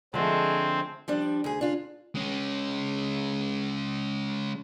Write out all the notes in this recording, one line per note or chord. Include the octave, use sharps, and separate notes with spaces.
D3 F3 G#3 A3 C4
F3 G3 D4
D2 G#4
D4 F4
G#3 C#4